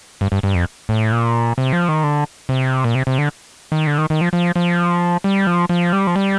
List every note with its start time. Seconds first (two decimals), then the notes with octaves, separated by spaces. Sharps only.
0.21 G2
0.32 G2
0.43 G2
0.55 F2
0.89 A2
1.12 A#2
1.58 C3
1.73 F3
1.89 D#3
2.04 D3
2.49 C3
2.84 A#2
2.95 C3
3.07 C3
3.18 D3
3.72 D#3
3.87 D3
3.98 D#3
4.10 D#3
4.21 F3
4.33 F3
4.56 F3
5.24 G3
5.47 F3
5.69 F3
5.93 G3
6.07 F3
6.16 G3